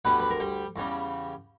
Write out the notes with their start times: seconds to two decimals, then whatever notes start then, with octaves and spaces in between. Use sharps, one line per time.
0.05 D2 D3 G3 B3 B4
0.20 B4
0.30 A#4
0.40 G3 G4
0.76 E2 C#3 G3